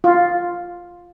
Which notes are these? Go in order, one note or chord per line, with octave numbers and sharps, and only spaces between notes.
F4